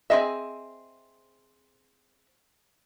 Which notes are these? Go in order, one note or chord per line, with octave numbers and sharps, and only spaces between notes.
C4 F#4 G#4 D#5 E5